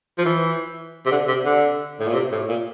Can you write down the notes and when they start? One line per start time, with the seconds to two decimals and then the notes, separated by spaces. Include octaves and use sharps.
0.18 F3
0.25 E3
1.06 C3
1.11 D3
1.28 C3
1.45 D3
2.00 A2
2.07 A#2
2.14 C3
2.32 A2
2.49 A#2